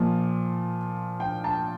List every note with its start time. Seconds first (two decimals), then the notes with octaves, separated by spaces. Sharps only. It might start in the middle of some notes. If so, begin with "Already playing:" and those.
Already playing: A#2 F3
1.20 G5
1.44 A5